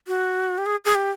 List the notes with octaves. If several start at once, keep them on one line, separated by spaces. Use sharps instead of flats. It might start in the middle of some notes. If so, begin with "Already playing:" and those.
F#4
G4
G#4
G#4
G4